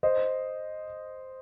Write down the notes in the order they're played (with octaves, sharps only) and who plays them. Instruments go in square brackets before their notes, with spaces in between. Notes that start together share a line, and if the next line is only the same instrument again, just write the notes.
[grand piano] C5 D#5